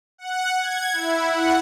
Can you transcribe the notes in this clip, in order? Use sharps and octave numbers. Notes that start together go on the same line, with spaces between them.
F#5
G#6
E4
F#5